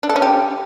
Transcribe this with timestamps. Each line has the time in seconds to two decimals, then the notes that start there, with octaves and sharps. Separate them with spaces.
0.03 D4
0.09 A4
0.16 C#4
0.22 G4